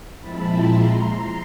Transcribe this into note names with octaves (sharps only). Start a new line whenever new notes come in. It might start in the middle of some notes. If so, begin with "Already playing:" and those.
A#2 F3 G#3 C4 E4 A5 B5
A#5 C6
A#5 C6